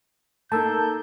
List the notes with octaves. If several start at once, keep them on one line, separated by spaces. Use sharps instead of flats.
A#3 D#4 A4 A5 E6 G6